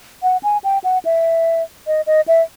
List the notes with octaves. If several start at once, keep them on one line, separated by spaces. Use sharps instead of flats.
F#5
G#5
G5
F#5
E5
D#5
D#5
E5